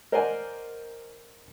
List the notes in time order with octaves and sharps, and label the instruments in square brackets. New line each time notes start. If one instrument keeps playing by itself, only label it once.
[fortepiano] A#4 C5 D5 D#5 F#5 G#5